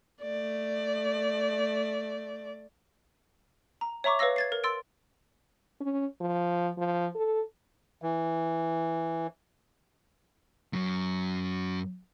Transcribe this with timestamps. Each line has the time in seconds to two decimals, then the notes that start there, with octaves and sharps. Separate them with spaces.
0.22 A3 D5
3.81 A#5
4.04 C#5 E5 A#5 C#6 D6
4.19 B4 C#5 F5 E6 A#6
4.36 G#6 A6 C7
4.52 A#4
4.64 C6 E6 A6 D7
5.81 C#4
6.21 F3
6.78 F3
7.15 A4
8.02 E3
10.73 F#2 F#3